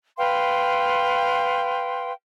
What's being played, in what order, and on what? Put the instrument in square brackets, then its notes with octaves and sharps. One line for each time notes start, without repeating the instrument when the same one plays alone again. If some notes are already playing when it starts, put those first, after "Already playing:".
[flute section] B4 F5 G5 C6